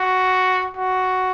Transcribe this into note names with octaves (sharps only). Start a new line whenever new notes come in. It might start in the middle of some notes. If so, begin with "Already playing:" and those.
Already playing: F#4
F#4